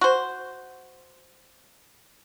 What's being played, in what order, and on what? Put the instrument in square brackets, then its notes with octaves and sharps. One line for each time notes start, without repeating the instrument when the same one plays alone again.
[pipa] F#4 C5